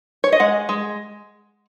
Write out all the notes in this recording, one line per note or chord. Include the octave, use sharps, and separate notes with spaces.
C#5
D#5
G#3 F#5
G#3